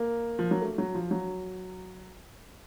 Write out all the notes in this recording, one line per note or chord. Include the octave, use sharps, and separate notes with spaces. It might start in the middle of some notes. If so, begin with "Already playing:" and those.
Already playing: A#3
F3
F#3
A3
F#3
F3
F#3